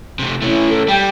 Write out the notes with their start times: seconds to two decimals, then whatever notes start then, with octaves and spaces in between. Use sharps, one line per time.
0.19 C3 A3
0.42 A3 C#4 E4
0.70 A4
0.88 G3 G5